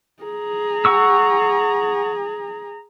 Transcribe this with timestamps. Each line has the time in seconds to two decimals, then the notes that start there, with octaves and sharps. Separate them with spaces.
0.23 G#4 A#5
0.85 F#5 C#6 E6